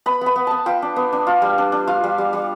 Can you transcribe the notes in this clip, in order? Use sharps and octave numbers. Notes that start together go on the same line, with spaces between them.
B3 B5
B3 B5
B3
B3 A5
F4 G5
D4
B3
D4
F4
G3
D4
D4
F4 F5
G3
G3
G3